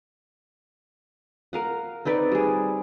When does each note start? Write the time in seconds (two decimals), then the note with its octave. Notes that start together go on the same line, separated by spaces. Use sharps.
1.53 A#4 F5 F#5
2.05 C4 D#4 B4 D5
2.32 G3 G#4